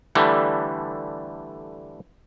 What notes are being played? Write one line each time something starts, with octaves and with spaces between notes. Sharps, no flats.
D3 E3 G3 A3